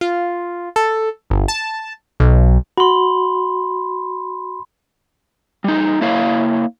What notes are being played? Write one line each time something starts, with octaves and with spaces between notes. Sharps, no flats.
F4
A4
G1
A5
B1
F#4 B5 C6
G3 D#4
A#3 E4 C#5 F5